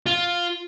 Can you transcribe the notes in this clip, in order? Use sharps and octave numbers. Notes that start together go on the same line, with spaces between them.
F4